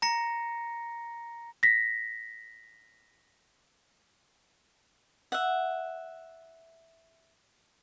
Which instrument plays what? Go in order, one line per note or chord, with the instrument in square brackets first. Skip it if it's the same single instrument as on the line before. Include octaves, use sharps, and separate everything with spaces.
[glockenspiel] A#5 A#6 C#7
[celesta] A#6 B6
[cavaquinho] E5 F#5